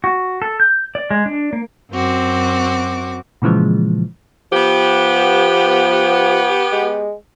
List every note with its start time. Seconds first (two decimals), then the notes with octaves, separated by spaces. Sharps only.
0.04 F#4
0.42 A4
0.60 G6
0.95 D5
1.11 G#3
1.26 D4
1.53 A#3
1.92 F#2 C4 F#4 D6
3.42 A#2 C#3 E3 F3 G#3
4.52 F3 B3 G4
6.72 G#3